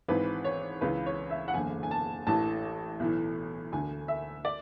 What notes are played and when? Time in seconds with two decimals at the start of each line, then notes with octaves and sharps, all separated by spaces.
0.08 G#1 G#2 E3 B4
0.44 C#5
0.81 C#2 C#3 E3 B4
1.06 C#5
1.31 E5
1.48 F#5
1.54 F#1 E2 D3 G#5
1.83 G#5
1.91 A5
2.27 A1 A2 E3 A5
3.00 B1 A2 E3
3.72 D2 D3 G#5
4.08 E5
4.45 D5